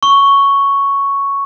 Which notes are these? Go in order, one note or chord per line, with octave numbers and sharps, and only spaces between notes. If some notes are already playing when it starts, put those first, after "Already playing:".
C#6